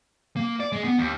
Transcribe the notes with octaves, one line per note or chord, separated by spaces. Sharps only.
A#3
D5
G#3
B3
D#2